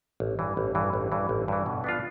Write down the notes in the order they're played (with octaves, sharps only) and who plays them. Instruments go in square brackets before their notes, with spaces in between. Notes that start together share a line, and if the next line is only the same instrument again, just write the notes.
[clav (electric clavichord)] A1
G2 E3
A1
G2 E3
A1
G2 E3
A1
G2 E3
B2
B3 D4 F4